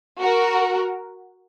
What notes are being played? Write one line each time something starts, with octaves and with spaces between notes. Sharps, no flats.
F#4 A#4